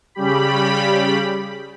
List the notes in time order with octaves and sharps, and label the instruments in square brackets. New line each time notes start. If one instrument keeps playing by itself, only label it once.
[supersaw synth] C#3 G3 G4 B5